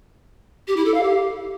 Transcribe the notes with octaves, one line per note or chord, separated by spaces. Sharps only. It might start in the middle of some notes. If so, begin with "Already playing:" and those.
G4
E4
A4
F5
G4